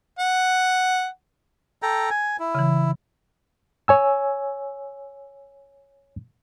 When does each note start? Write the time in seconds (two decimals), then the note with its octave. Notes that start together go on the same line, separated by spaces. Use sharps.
0.19 F#5
1.82 A4 G5 A#5
2.10 G#5
2.39 E4
2.55 C#3 E3
3.88 C#5 G#5 E6